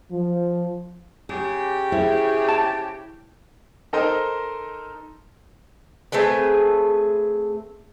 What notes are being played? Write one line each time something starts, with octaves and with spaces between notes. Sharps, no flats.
F3
C#3 G4 G#4
E4 G#4 C5 C#5
A5
D#4 A4 A#4 C5 D#5
A3 C4 G#4 B4